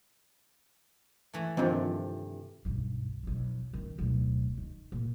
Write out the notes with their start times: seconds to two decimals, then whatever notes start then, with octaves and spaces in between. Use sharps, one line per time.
1.33 E3 A3
1.57 G2 C3 D#3 F3 C4
2.65 B1 G2
3.23 B1 F2
3.73 D#3 C#4
3.98 D1 B1
4.57 D#3
4.92 A#2